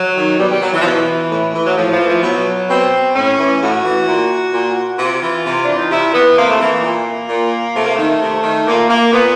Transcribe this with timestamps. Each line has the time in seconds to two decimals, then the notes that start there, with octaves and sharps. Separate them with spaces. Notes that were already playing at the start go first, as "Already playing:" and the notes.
Already playing: F#3
0.15 D#3
0.39 B2 G3
0.50 G3
0.61 F#3
0.73 E3
0.81 F3
0.85 B2 E3
1.31 A2
1.54 E3
1.65 F#3
1.76 A2 F3
1.92 F3
1.99 E3
2.08 F3
2.22 B2 F#3
2.69 B2 C4
3.15 A2 C#4
3.38 E3
3.61 A2 F#4
3.83 E3
4.07 A#2
4.53 A#2
4.99 C3 F4
5.22 E3
5.45 C3
5.65 E3 D4
5.77 D#4
5.90 C3 E4
6.13 E3 B3
6.37 C3 A#3
6.48 A3
6.60 E3 A#3
6.83 A#2
7.29 A#2
7.75 C3 A3
7.85 A#3
7.94 D#3 A3
8.21 C3
8.43 D#3
8.67 A#2 A#3
8.89 A#3
9.12 A#2 B3